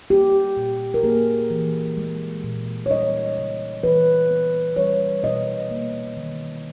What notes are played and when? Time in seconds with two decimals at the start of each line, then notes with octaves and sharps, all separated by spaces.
0.10 A#3 G4
0.57 A#2
0.94 A#4
1.03 A#3 G#4
1.51 E3
1.97 G#3
2.44 A#2
2.86 C#5
2.90 G3 D#5
3.37 C#3
3.83 E3 B4
4.30 B3
4.76 G3 C#5
5.23 B2 D#5
5.70 A#3
6.17 D#3